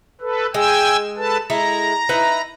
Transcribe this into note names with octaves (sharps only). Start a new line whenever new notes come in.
A4 B4
G#3 G5 G#5 E6
A4 B4 A5
G#3 E4 A4 A#5
D#4 E4 B4